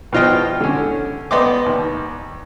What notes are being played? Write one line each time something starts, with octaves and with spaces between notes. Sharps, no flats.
B2 F3 F4 D#5 G5
D3 C#4
B3 D5 D#5 G5 C6 D6
D#2